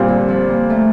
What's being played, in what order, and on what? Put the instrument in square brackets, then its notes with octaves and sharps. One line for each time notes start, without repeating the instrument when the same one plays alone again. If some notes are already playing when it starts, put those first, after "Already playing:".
Already playing: [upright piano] A#2 G3 C4
[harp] D3
F3
A#3
A3